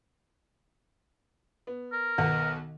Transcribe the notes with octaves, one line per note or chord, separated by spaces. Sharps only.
B3
A#4
B1 B2 D#3 F#5